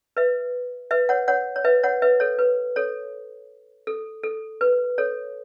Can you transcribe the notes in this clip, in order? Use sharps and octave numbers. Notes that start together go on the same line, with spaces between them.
B4 E5
B4 E5
C#5 F#5
C#5 F#5
C#5
B4 E5
C#5 F#5
B4 E5
A4 C#5
B4
A4 C#5
A4
A4
B4
A4 C#5